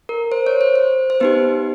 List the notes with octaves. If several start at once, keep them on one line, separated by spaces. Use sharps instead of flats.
A#4
C5
C#5
C5
C5
C5
B3 D#4 G4 B4